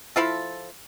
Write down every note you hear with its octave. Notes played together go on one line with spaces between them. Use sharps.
F3 E4 F4 A4